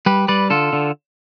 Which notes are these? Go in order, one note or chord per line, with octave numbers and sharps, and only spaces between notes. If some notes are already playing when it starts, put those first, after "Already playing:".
G3 G4 B4
G3 B4 D5
D3 F4 A4
D3